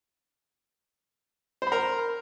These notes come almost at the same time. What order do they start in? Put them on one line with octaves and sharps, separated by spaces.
C5 B5 A#4